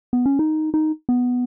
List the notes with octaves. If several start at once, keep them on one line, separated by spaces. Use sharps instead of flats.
B3
C#4
D#4
D#4
B3